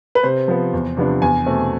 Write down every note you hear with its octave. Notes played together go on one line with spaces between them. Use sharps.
B4
C3 C5
F3 B3
E2
C3 F3 B3 D4
E2 G#5
B2 A3 C4